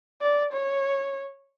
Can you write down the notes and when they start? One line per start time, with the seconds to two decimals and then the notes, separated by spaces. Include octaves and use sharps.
0.21 D5
0.53 C#5